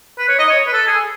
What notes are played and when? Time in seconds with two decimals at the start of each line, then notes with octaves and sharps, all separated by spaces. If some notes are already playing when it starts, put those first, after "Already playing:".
0.19 B4
0.29 C#5
0.39 D#5
0.50 C#5
0.67 B4
0.73 A4
0.87 G#4